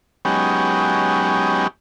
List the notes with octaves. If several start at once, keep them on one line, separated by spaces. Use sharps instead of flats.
F#3 G#3 B3 C#4 D#4 G4